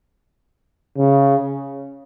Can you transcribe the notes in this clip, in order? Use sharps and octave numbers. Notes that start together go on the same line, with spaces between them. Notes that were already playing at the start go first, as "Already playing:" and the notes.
C#3